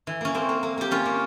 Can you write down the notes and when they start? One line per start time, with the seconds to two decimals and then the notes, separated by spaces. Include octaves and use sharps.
0.07 E3
0.21 A#3 C#4
0.34 A#3 C4
0.49 A#3
0.63 A#3
0.78 A#3 G4
0.91 A#3 C#4 F4
1.05 A#3